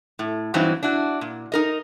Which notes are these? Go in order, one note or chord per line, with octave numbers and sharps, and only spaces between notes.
A2
G2 E3 F#3 C4 D#4
D4 E4 F#4
A#2
D#4 A#4 D#5